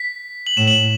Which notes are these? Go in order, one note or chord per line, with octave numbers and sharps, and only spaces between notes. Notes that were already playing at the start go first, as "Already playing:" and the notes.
Already playing: B6
F#7
A2 E7
F#7
E7